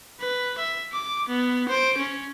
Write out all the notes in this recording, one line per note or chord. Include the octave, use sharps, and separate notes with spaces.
B4
E5
D6
B3
C5 D7
C#4